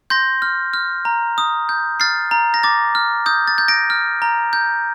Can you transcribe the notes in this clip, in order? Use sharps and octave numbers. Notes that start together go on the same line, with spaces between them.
C6 G6 A#6
F6
F6
A#5
D#6
G6
F6 A6 C7
A#5
A#6
D6 A6
F6
D#6 G6
A6
G6
A#6 D7
F6
A#5
G6